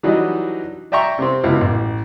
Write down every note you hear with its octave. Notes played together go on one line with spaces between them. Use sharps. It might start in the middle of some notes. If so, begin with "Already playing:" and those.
E3 F#3 G3 D4 D#4
D5 E5 G5 A#5 C#6
C3 C4
C#2 B2 E4
A1